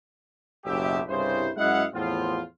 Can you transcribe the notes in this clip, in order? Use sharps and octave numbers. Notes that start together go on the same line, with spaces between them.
F#1 B1 G4 E5
C2 G2 C#3 E4 C5
F#2 G#3 E4 D#5 F5 F#5
E2 A2 F3 B3 C4 F4